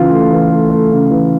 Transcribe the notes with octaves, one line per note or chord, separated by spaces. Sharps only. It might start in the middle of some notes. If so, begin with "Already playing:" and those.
Already playing: C#3 E3 F4
A3
E3
A3
A3
C#3
E3